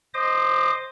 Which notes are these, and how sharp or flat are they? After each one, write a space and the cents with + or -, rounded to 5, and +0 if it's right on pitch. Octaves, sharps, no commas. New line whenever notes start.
C5 +0 D#5 +0 D6 +40